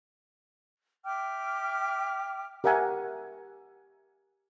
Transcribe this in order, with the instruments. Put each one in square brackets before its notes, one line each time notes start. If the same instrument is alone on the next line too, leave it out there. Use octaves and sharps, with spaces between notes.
[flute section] E5 G5 D6 F6
[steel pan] G4 A#4 E5 F#5 G#5